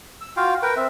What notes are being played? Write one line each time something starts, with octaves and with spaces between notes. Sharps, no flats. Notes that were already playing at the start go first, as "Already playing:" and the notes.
E6
F4 F#4 F5 G5
A#4 B4 G5
C4 E5